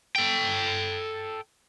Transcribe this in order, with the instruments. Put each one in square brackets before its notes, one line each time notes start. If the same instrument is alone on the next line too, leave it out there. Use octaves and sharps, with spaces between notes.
[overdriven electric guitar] A4 G5